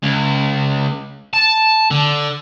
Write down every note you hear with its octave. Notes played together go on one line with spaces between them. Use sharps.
C#2
A5
D3